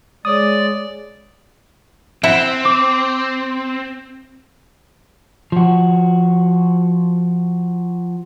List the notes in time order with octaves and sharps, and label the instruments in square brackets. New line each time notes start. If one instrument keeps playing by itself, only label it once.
[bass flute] G#3 [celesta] C#5 D6 A6 [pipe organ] D5 [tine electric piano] D#6
[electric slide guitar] C4 [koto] E4 E5 F#5
[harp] D6
[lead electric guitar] F3 F#4